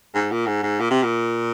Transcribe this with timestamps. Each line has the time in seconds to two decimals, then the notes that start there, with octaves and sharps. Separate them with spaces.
0.14 G#2
0.31 A#2
0.46 G#2
0.63 G#2
0.80 A#2
0.91 C3
1.03 A#2